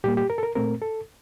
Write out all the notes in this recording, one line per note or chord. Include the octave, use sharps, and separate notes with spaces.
A#2 G3 A#3 G4
G4
A#4
A4
A#4
A#2 A3 C4 A#4
A4